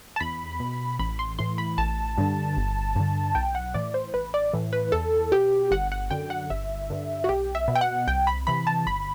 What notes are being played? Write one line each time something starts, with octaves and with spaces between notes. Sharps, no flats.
A5
E2 B5
B2
A1 B5
C6
A2 E3 C6
B5
A1 A5
G2 D3
G1
G2 D3
B1 G5
F#5
A2 E3 D5
C5
A1 B4
D5
A2 E3
B4
E2 A4
B2 G4
G1 F#5
F#5
F#2 D3 G5
F#5
G1 E5
G2 D3
F#4
B1 G4
E5
B2
G5
F#5
C2 G5
B5
C3 E3 B5
A5
G1 B5